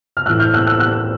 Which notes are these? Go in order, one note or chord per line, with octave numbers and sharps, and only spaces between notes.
F6
A2 E3 A3 E6 F#6
F6 G6
E6 F#6
E6 F#6
E6 F#6